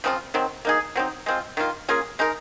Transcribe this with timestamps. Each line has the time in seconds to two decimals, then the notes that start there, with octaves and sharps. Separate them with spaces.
0.04 C#3 F3 C4 F4
0.34 D#3 F#3 C4
0.65 A#3 D#4 G#4
0.96 F#3 C4 D#4
1.26 G#3 C4 F4
1.57 D#3 A#3 F4
1.89 A#3 C#4 F4 G#4
2.19 G#3 D#4 A#4